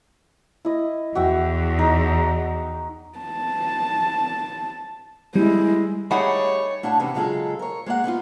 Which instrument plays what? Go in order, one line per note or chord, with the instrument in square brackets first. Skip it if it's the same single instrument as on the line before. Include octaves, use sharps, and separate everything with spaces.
[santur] E4 D#5
[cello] E2 [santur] F#4 E5 G5
[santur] D#4
[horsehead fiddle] A5
[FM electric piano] G3 [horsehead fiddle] G#3 E4
[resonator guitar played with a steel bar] G3 A3 G#4 [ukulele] D#4 F#5 B5 [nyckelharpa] C#5
[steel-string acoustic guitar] A2 D4 F5 F#5 A5
E2 C3 B3 C#4
C#3 F#3 G#3 F4 G#4 A4
A#4 C#5
G#3 A#3 A#4 F#5
G3 B3 D#4 F4